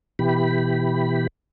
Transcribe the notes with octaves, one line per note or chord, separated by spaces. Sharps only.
B2 E3 G4 B5